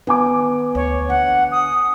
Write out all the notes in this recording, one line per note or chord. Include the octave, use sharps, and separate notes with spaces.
D#3 B3 G#5 D6
D2 C#5
D3 D4 F#5
D#6